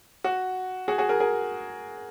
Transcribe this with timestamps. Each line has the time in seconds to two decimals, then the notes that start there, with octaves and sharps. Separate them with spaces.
0.24 F#4
0.88 F#4 G#4
0.98 F#4 G#4
1.09 G#4 A#4
1.20 G#4 A#4